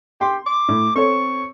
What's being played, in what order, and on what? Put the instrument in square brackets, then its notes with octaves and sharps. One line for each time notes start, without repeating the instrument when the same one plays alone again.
[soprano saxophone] G4 [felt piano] C6
[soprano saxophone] D6
[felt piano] A2
[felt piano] C4 A4 C#5 [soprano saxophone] C#6